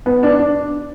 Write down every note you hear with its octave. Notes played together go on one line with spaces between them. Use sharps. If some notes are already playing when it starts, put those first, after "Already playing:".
B3
D4
D4